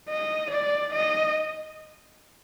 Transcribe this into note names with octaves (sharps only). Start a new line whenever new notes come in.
D#5
D5
D#5